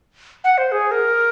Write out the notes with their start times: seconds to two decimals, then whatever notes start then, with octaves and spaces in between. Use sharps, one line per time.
0.44 F#5
0.58 C5
0.72 G#4
0.91 A#4